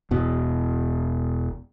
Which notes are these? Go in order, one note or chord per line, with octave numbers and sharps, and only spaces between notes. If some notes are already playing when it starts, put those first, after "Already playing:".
E1 B2